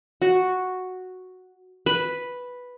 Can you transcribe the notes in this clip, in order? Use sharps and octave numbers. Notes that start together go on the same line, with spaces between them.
F#4
B4